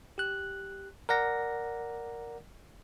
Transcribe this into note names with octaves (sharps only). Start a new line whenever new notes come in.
G4 F#6
A#4 D5 F#5 A#6